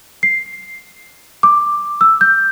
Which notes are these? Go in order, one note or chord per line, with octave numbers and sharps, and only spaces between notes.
C7
D6
E6
G6